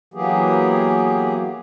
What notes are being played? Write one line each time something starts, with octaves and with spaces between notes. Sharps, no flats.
E3 F#3 A#3 B3 G4 G#4